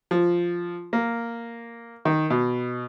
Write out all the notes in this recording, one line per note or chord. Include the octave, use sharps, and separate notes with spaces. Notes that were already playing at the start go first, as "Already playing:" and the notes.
F3
A#3
D#3
B2